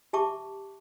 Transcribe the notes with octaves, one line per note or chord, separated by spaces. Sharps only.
G4 E5 A5 C#6 D6